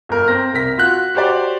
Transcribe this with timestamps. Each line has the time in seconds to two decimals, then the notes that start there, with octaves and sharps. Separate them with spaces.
0.09 G1 A#4
0.28 C4 A#6
0.53 C2 A#4 A#6 B6
0.78 F4 F#4 F#6
1.15 F#4 G4 C5 D5